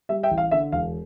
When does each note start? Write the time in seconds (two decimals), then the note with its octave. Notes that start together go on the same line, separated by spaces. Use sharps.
0.09 G3 E5
0.23 E5 G5
0.31 A1
0.38 F5
0.51 D3 E5
0.72 E1 F5